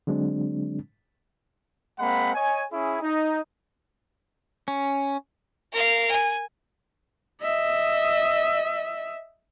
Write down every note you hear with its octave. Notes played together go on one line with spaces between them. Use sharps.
D3 F#3 G#3 C4 D4
G#3 A#3 C4 F#5 B5
C#5 D#5 G#5
C#4 E4 G#4
D#4
C#4
A#4 F5
G#5
D#5 E5